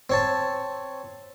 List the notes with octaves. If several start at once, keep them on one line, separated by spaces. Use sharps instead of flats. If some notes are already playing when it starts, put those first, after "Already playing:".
C4 C#5 A5